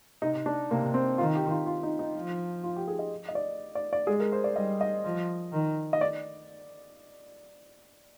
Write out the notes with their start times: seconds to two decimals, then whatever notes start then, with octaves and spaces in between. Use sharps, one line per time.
0.22 C3 D#4
0.46 D4
0.70 C3 A#3
0.94 C4
1.18 D#3 F4
1.35 G4
1.50 F4
1.66 F4
1.83 D#4
1.99 D#4
2.15 F3
2.64 F4
2.76 G4
2.88 G#4
2.99 D#5
3.28 D#5
3.35 D5
3.75 D5
3.93 D5
4.07 G#3 G#4
4.20 A#4
4.32 C5
4.44 D5
4.56 G3 D#5
4.81 D#5
5.04 F3
5.52 D#3
5.93 D#5
6.01 D5